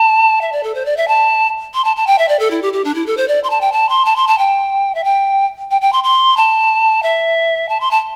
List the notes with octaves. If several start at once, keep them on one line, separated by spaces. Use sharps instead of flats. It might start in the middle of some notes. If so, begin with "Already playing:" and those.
Already playing: A5
E5
D5
A4
C5
D5
E5
A5
C6
A5
A5
G5
E5
D5
A4
E4
G4
G4
D4
E4
A4
C5
D5
C6
A5
G5
A5
C6
A5
C6
A5
G5
E5
G5
G5
G5
C6
C6
A5
E5
A5
C6
A5